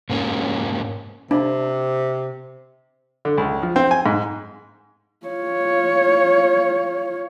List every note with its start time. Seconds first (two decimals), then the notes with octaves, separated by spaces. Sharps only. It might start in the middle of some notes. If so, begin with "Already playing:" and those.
0.10 G#2 A#3 C#4
1.31 C3 D4
3.25 D3
3.38 C#2
3.63 F3
3.76 C4
3.91 G#5
4.06 G#2
5.26 F4 C#5